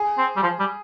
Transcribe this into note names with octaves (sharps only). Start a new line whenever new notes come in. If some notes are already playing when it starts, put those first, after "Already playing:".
Already playing: G#4
C4
G3
F3
G3